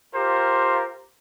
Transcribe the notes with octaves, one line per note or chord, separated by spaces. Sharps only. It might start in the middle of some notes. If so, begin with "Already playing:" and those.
F4 G4 A#4 C5